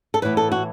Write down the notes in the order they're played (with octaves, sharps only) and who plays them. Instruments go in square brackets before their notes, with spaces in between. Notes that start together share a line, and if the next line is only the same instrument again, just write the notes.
[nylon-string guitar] A4
A2 E3 B3 B4
A4
F#4